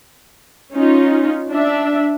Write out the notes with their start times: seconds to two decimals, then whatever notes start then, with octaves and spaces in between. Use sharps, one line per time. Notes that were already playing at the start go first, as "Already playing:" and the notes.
0.73 C#4 D#4 F4
1.50 D4 E5